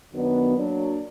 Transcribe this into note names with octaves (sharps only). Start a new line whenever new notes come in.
F#2 D#3 F#3 B3 D4
F#3 A#3 D4